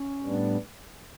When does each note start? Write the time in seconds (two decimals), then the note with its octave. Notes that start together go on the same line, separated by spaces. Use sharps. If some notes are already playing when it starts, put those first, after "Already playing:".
Already playing: C#4
0.23 A2 G3 B3 D4